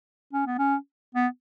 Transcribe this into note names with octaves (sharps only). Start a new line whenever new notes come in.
C#4
B3
C#4
B3